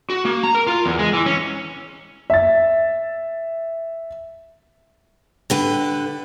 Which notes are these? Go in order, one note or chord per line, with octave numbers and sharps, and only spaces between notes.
F#4
A#3
A#5
A#4
F4
E2
G#3
E3
C#4
E5 A6
D3 G4 B4